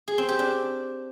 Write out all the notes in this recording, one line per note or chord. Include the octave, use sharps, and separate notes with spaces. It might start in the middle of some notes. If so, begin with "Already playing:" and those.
G#4
C4
G4
D4